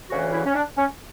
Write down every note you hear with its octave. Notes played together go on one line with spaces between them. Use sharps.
D2 C#3 E3 F#4
E4
C#4
D4
C#4